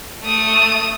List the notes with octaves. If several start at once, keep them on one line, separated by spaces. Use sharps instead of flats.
A3 D#6